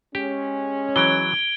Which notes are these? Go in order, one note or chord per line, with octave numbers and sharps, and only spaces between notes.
G#3 C#4 G4
E3 F#3 G#6 D7 G7